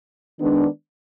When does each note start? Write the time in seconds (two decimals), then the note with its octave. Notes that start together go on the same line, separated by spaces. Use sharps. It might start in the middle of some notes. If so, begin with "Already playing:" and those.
0.39 D#3 G#3 B3 D4